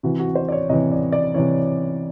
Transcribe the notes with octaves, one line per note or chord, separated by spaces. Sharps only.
C3 E3 F#4
F#4
C5
D5
C#5
C3 E3 D#5
D5
D5
C3 E3 C#5